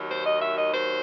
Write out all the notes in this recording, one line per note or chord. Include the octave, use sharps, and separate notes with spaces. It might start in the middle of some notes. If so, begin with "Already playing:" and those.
Already playing: D#2 D#3 F#3
C5
D#5
E5
D#5
C5